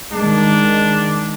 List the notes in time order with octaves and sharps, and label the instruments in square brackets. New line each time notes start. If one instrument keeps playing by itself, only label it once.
[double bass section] D#3 G#3 [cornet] D4